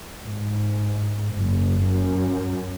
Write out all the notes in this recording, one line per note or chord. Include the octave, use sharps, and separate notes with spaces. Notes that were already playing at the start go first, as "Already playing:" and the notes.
G#2
F#1
F#2